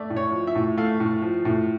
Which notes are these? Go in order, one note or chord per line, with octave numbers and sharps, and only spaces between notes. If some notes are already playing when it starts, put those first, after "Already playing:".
Already playing: A3 D5
A2
C#5
F3
E5
A2
A3 F5
A2
F3
A2